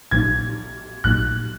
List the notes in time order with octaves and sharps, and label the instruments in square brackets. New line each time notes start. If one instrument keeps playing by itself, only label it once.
[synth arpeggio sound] A#1 A#2 F#3 A#3 D#4 [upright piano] G#6
[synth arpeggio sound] A#1 A#2 F#3 A#3 D#4 [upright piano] F#6